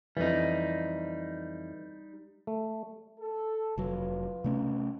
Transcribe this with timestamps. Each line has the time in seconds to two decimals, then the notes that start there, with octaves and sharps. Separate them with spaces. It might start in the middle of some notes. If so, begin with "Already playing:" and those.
0.17 F2 E3 G3 D#4
2.47 A3
3.19 A4
3.78 F1 F#3 F4 B4
4.44 C3 A3 C#4